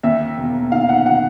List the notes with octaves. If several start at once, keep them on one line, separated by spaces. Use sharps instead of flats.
D#2 E5
E1
D#3 F5
F#5
F#5